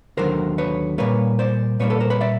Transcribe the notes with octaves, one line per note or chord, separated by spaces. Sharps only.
D#2 D3 F#3 A#4 C5
B4 C#5
A#2 G3 A#3 B4 C#5
C5 D5
A#2 G3 A#3 B4 C#5
A4 B4
A#4 C5
B4 C#5
D5 E5